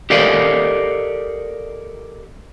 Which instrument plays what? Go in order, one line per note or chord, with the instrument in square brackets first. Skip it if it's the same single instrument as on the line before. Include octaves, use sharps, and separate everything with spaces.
[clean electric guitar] G4 A4 A#4 D5 D#5 F5